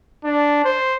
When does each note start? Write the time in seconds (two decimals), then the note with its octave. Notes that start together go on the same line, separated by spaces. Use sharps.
0.24 D4
0.64 C5